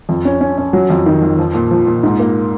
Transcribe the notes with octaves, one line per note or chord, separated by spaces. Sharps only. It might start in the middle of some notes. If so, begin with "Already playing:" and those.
F2
C#4
C#4
C#4
F#3
F2
D#3
F2
F3
A#2
F3
A#2
G#2
A#3